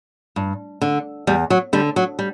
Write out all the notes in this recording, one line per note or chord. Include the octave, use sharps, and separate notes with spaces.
G2
D3
E2 G3
F#3
D3 G3
F#3
G3